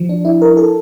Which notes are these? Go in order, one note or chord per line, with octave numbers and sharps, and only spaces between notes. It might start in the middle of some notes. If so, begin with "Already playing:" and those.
Already playing: F3
D4
E4
A#4
A4